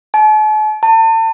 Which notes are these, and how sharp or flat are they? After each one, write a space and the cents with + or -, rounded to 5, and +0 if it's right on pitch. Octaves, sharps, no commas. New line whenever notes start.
A5 -45
A5 +35